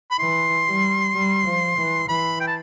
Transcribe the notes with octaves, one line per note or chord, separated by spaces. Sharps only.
B5
E3 C6
G3
G3
F3
E3
E3 B5
G5
A5